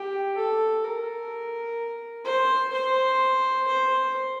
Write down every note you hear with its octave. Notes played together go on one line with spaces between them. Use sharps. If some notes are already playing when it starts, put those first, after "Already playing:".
Already playing: G4
A4
A#4
C5
C5
C5